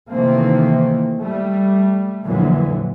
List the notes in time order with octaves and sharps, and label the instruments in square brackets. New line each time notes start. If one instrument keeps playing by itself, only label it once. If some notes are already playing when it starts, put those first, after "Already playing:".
[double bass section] C3 D#3 E3 A3 A#3 C4
G3 A3
F2 A#2 D3 E3 F#3